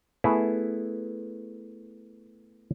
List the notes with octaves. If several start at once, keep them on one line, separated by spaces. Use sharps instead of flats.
A3 B3 E4 G#4